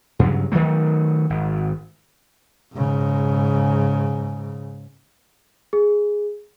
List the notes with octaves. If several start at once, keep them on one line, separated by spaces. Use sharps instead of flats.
G2 C#3 F#3
D#3 E3 F#3 A3
G#1
G#2 C#3
G#4